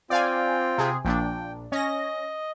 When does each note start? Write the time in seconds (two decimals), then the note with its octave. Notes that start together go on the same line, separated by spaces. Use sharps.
0.10 C4 F4 D5 F5 G5 G#5
0.78 C3 G#4
1.05 A#1 A#2 D4 G5
1.72 C#4 D#5 A#6